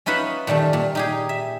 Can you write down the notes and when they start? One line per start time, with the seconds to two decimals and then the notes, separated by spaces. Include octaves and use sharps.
0.06 C#4 D#4 F4 B4 E5 F#5
0.47 A#2 D#3 G3 A3
0.73 A#2
0.95 D#4 G4 G#4
1.29 E5